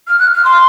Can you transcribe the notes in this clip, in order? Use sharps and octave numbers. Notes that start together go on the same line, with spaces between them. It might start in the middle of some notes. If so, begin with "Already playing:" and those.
F6
F#6
F6
C6